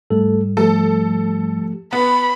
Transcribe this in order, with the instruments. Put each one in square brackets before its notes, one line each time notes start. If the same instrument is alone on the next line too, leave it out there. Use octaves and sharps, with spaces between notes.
[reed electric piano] G#2 G3 [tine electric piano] A3 A4
[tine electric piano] F3 A3 G4 [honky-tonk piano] A4
[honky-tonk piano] B3 [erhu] B5